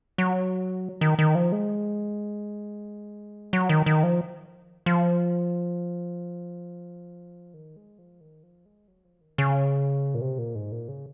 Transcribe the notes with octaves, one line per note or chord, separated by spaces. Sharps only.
F#3
D#3
D#3
F3
G#3
F#3
D#3
D#3
F3
F3
D#3
G#3
F3
D#3
F3
G#3
F#3
F3
D#3
C#3
A#2
C3
A#2
G#2
A#2
C#3